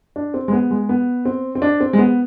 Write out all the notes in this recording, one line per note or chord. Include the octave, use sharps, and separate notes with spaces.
D4
C4
G#3
B3
G#3
B3
C4
C4
D4
C4
G#3
B3